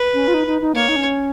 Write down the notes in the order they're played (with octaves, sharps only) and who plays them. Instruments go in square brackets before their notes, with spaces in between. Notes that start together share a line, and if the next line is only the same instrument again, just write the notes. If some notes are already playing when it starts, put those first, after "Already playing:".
Already playing: [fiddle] B4
[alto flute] C#4
F4
D#4
D#4
D#4
[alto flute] A#3 [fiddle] C#5
[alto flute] D#4
C#4